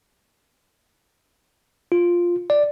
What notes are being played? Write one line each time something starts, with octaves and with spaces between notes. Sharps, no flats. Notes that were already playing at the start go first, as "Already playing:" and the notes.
F4
D5